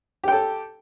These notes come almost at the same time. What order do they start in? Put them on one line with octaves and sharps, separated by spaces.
G4 G5 A4